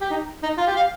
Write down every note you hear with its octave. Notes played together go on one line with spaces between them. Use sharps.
G4
D#4
D#4
F4
G4
F5